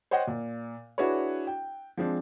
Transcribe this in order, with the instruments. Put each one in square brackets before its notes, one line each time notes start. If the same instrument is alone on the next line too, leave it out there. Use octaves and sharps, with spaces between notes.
[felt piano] C5 C#5 D#5 F#5 G5
A#2
D4 E4 F#4 G#4 B4 C#5
G5
F3 G#3 C4 D4